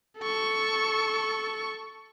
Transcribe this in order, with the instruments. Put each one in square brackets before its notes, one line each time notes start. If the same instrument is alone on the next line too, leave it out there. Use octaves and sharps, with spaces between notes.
[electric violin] A4 C#6